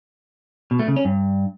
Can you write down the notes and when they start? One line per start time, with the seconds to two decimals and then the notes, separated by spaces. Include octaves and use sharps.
0.71 B2
0.79 A3
0.88 C#3
0.96 C#4
1.05 G2